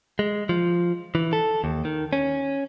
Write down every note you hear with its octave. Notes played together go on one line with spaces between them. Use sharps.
G#3
F3
E3
A4
D#2
D#3
C#4